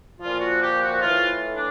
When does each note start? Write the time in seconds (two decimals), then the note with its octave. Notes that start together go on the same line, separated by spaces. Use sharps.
0.21 A#2 F3 F4
0.40 F#4
0.61 G4
0.81 F#4
1.01 A2 E3 F4
1.55 D4